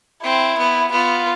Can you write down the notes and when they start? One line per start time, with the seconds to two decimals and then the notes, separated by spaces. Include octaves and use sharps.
0.24 C4 E4
0.58 B3
0.92 B3 F4